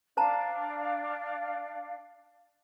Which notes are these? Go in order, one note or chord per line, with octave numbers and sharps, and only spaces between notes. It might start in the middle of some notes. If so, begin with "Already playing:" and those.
D4 C5 F5 A5 A#5